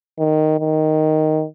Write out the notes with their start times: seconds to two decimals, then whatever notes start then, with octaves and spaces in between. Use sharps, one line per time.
0.19 D#3
0.59 D#3